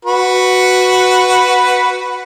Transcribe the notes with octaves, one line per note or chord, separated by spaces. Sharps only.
F#4 B4